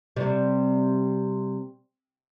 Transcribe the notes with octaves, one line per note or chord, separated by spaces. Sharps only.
C3 G3